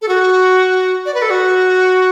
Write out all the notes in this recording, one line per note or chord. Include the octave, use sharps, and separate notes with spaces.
A4
F#4
D5
B4
A4
F#4